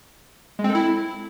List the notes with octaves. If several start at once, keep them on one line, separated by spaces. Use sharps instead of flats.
G#3
C4
A4
E4